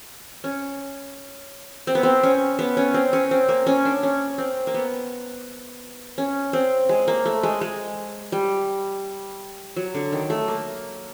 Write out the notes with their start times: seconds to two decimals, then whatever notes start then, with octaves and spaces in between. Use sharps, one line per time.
0.44 C#4
1.87 C4
1.95 B3
2.03 C4
2.23 C#4
2.59 B3
2.77 C#4
2.94 C4
3.13 C#4
3.31 C4
3.49 A#3
3.67 C#4
3.85 D4
4.03 C#4
4.38 C4
4.67 A#3
4.74 B3
6.18 C#4
6.53 C4
6.89 G#3
7.08 A#3
7.26 A3
7.43 G#3
7.61 G#3
8.32 G3
9.76 F#3
9.95 D3
10.12 D#3
10.30 A3
10.48 A#3